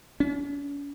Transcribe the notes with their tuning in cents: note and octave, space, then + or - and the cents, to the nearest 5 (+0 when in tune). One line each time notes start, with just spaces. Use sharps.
C#4 +45